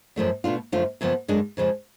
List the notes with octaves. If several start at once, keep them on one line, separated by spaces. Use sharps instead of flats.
F#2 F3 A3 D4
B2 A3 D4 F4
F#2 D3 F3 A3 F4
F#2 C#3 F3 B3
F#2 D3 G#3 D4
F2 C#3 F3 G#3